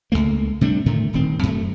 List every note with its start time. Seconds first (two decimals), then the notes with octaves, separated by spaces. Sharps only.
0.12 C#2 F#2 A3 A#3
0.61 C3 G3 A3 D4
0.86 A2 D3 D#3 A3
1.13 D#1 D#3 C4
1.43 F#2 A3